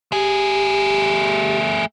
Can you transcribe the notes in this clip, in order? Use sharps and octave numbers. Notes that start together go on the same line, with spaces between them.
A3 G4 G#4